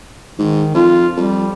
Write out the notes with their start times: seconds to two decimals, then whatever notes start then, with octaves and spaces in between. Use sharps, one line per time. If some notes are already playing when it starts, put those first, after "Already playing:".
0.39 G#2 D#3
0.75 F2 F4
1.17 F2 G3